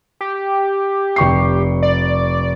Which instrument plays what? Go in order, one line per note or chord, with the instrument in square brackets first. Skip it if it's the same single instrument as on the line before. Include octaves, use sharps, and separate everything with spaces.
[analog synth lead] G4
[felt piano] F1 C#6 C7
[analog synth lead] D5